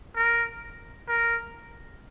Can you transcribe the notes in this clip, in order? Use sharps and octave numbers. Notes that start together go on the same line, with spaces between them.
A#4
A#4